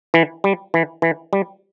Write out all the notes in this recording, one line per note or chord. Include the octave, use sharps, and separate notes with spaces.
E3
G3
E3
E3
G3